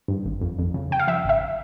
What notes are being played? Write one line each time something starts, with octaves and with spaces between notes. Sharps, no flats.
G2
G#1
F2
F2
C#3
C#3 G5
F5
F3 E5
G#1 E5